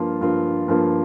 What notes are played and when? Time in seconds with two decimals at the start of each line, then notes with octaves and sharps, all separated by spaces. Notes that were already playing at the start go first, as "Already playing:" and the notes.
Already playing: G2 F3 A#3 F4
0.21 G2 F3 A#3 F4
0.68 G2 F3 A#3 F4